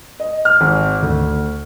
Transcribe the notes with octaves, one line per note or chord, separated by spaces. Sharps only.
D#5
F6
G#1
D2